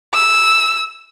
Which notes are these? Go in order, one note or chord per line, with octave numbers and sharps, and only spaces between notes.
E6